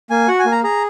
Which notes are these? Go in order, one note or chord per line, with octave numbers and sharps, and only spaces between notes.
A#3 G#5
F#4 F#5
G#5
A#3
A#5
G#4 A#5